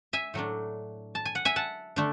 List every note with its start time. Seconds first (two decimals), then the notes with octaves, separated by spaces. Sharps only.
0.13 E5 G#5
0.34 A2 F#3 A3 D4
1.15 A5
1.25 G#5
1.35 F#5
1.45 E5 G#5
1.56 F#5 A5
1.96 D3 A3 D4